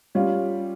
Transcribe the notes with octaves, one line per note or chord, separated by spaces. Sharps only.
G3 C#4 F4